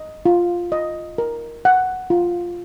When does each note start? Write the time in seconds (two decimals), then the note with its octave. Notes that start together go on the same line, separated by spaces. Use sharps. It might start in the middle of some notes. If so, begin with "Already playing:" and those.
Already playing: D#5
0.26 F4
0.72 D#5
1.18 A#4
1.65 F#5
2.10 F4